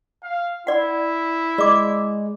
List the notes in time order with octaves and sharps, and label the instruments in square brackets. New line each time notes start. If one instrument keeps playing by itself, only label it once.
[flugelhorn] F5
[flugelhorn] E4 [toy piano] D5 F#5
[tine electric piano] G#3 [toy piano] D5 D6